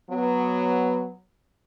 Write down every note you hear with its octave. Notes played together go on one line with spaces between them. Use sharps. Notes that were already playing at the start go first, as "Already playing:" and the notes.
F#3 B3